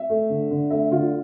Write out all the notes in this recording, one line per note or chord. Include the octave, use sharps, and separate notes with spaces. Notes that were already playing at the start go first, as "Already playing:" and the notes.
Already playing: E5
A3
D3
D3
A3 E5
D3 F4